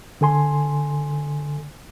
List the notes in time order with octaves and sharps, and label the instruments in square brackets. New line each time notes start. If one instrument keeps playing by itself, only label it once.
[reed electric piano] D3 A4 G#5 C6